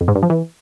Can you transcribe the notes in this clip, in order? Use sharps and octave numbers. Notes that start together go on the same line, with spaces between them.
F2
G#2
G2
F3
E3